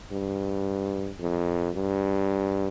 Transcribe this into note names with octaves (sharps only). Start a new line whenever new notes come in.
G2
F2
G2